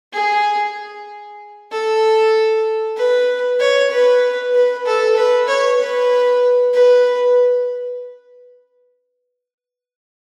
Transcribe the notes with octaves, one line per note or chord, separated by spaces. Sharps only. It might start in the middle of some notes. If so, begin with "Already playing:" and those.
G#4
A4
B4
C#5
B4
B4
A4
B4
C#5
B4
B4